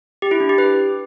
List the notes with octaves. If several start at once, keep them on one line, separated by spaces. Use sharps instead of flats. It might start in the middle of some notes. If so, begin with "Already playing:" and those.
G4
E4
D4
G4
B4